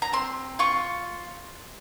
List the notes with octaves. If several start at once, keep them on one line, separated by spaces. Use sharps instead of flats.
A#5
C4 C6
F4 C#6